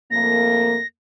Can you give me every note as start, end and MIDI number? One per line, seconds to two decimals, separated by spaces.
0.11 0.77 41
0.11 0.77 57
0.11 0.77 58
0.11 0.86 94